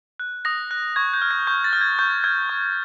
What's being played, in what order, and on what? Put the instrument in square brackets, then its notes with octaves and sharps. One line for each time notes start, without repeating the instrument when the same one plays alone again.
[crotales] F#6
D#6 A#6
F#6
C#6 G#6
G6
F6
G#6
C#6 G6
A6
F6
G#6
C#6 G6
F6 G#6
C#6